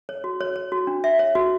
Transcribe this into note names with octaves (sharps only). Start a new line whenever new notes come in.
C#5
F#4
C#5
C#5
F#4
D4
E5
C#5
F#4